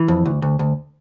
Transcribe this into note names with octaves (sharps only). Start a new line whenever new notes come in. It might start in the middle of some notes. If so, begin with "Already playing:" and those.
Already playing: E3
F2
D2
D2
D2